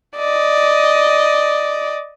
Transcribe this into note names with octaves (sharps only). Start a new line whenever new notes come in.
D5 D#5